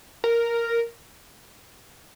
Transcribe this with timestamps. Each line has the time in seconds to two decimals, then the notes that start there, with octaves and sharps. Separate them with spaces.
0.24 A#4